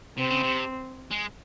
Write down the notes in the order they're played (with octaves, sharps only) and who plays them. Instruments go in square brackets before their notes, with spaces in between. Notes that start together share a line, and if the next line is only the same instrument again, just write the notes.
[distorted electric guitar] C3 [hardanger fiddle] C4
[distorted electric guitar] C#3
C3
G#3